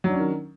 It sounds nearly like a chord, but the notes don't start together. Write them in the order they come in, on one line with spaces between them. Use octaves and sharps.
F#3 D4 C#4 D#3